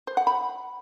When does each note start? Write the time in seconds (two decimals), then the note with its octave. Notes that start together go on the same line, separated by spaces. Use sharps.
0.07 C5
0.17 F#5
0.27 B5